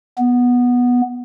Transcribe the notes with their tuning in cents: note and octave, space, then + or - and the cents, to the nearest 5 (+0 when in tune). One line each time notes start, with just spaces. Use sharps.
B3 -10